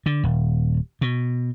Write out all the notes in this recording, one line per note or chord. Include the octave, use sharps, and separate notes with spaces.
D3
D#1
B2